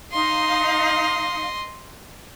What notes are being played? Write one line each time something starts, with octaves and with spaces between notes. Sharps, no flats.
D#4 D#5 F5 C6